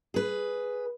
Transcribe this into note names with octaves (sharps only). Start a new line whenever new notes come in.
G#4 B4